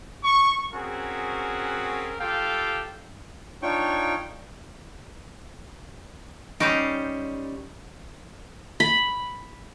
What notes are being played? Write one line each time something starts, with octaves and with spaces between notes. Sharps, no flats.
C#6
C4 C#4 F#4 G#4 A#4
F4 G4 A4 F5 G5
D4 D#4 F4 C#5 G5 C#6
G3 C#4 D#4 C5 C#6 A#6 D7
B5